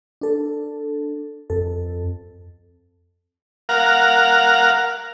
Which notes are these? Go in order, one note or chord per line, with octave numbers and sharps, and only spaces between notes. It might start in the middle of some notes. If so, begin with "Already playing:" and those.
D4 A4
F2 A4
A#4 F5 F#5